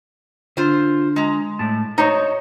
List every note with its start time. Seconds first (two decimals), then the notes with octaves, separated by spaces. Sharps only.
0.57 D3 F4 C5
1.16 G#3 A#5
1.59 A2 A5
1.98 D#4 F#4 C5 C#5 D#5